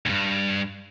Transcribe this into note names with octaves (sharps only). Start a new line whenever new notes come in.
D2 G2